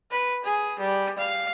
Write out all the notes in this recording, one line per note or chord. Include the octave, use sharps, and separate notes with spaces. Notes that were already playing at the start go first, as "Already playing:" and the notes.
B4
G#4
G3
F5